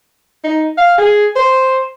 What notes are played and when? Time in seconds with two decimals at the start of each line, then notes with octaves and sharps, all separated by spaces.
0.44 D#4
0.78 F5
0.98 G#4
1.36 C5